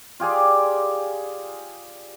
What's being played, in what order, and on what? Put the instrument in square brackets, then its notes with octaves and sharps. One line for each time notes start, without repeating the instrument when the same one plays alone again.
[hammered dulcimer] F4 G4 G#4 D5